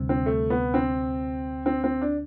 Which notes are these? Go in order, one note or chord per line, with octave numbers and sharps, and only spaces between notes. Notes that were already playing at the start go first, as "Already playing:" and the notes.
Already playing: D2 C3 G3
C4
A3
B3
C4
C4
C4
D4